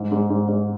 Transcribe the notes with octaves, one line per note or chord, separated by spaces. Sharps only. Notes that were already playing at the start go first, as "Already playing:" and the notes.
Already playing: G#2
G#2
G#2
G#2